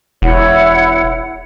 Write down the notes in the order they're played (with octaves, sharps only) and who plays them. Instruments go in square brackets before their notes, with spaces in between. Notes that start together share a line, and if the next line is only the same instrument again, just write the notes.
[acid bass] E1 [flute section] E4 C#5 F#5